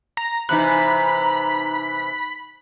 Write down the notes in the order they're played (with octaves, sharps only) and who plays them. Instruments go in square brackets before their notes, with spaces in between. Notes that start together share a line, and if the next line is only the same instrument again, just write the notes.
[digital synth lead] A#5
[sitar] C3 E3 [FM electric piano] D#4 F#6 [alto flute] A#5 [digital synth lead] B5